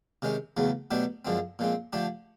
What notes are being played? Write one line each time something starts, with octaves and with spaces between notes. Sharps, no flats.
C3 D#3 G#3 C#4
E2 C#3 F#3 A3
B2 F#3 A3 D4 G4
F#2 D3 F3 G#3 C4
A#2 F3 G#3 C4
D3 F3 A3 D4 G4